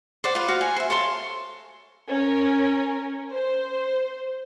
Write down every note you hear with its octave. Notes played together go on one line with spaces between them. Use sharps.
C5 D5 F#5
F4 B4
F#4 C5 F5
G#5
C5 E5
A4 C#5 F5 C6
C#4 A#4
C5